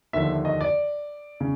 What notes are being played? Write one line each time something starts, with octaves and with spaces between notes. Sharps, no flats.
D#2 D3 F3 E5
D#5
D5
C#3